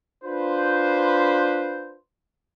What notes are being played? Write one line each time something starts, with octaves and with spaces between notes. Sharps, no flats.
D4 F4 B4 C5